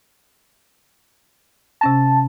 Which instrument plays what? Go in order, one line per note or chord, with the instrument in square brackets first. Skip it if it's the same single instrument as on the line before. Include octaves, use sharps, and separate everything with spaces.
[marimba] C3 C#4 A#6 [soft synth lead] A5